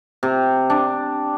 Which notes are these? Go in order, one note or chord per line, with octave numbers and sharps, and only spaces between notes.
C3
D4